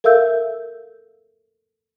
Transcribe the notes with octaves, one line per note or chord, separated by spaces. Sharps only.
A4 A#4 E5 F5 E6 G6